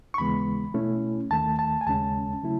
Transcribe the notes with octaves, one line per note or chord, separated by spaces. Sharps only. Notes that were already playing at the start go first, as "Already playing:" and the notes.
C#6
D#2 C#3 E3 G#3 B3 B5
B2 A3 C#4 E4
D#2 D#3 A3 A5
A5
G#5
D#2 C#3 G#3 C#4 A5
C#3 F#3 A3 C#4 E4